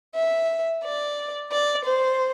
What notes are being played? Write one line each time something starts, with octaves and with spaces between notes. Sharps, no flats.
E5
D5
D5
C5